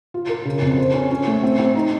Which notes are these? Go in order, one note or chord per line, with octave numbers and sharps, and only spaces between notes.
F4
A#4
C#3
F2
C5
C#4
C#4
A3
C4
C4
D#4